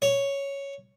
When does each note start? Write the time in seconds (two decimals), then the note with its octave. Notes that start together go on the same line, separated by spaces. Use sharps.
0.02 C#5